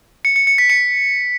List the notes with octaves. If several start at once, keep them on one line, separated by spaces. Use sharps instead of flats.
C#7
C#7
C#7
B6
C#7